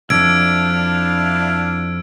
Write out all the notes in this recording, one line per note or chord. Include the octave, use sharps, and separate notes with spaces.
C2 F2 D4 E4 F5 E6 G#6 D7